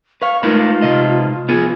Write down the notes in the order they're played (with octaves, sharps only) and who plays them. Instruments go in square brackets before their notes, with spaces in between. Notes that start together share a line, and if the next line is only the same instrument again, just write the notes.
[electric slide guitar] B4 F5 [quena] C#6
[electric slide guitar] G#3 D#4 B4 [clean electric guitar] A3 A#4 B5 [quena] F4
[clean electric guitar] C3 D#5
[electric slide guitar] F3 B3 [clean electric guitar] F4 G#4